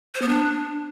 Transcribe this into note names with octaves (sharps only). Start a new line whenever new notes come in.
C5
B3
D4